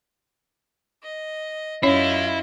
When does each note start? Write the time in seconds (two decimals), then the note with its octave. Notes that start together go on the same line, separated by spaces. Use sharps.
1.03 D#5
1.83 F#2 C#4 E4 F4 C#5 D#5